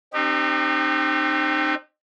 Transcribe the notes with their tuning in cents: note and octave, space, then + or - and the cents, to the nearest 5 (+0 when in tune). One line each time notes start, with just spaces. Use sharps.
C4 +25 D#4 -35 G4 +0